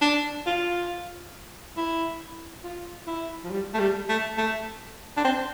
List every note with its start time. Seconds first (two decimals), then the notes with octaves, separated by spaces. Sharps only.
0.01 D4
0.46 F4
1.77 E4
2.64 F4
3.07 E4
3.44 F3
3.51 G3
3.74 A3
3.79 G3
4.09 A3
4.38 A3
5.17 D4
5.24 C4